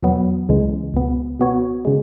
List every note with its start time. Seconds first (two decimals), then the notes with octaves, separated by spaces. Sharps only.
0.02 E2 B2 F#3 B3
0.49 C#2 C#3 E3 G#3
0.94 C#2 B2 B3
1.39 B2 B3 F#4 C#5
1.85 C#3 G#3